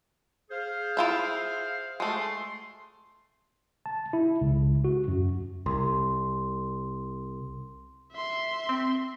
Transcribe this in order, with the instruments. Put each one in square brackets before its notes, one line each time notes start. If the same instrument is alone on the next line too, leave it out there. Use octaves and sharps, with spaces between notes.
[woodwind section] G#4 C5 F5
[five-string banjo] E4 F4 E5
[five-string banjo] G#3 A3 [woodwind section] C6
[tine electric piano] A5
E4
C#2
F#4
F#2
[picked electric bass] C2 [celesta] C6
[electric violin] E5 C6
[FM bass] C4